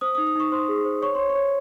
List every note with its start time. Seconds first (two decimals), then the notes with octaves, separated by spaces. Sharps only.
0.01 C5 D#6
0.15 D#4 D#6
0.27 D#6
0.35 D#4 C#6
0.52 C5 C6
0.68 G#4
0.85 C5
1.02 C#5 C#6
1.15 C#5 C6
1.30 C#6
1.35 C#5